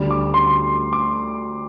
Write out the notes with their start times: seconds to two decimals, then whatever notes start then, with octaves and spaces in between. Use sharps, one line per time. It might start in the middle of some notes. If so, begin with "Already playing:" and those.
Already playing: D2 D3 G3
0.11 D6
0.34 C6
0.93 D6